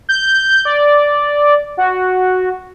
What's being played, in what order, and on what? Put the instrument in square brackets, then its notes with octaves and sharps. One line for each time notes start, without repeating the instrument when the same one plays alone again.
[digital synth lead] G6
D5
F#4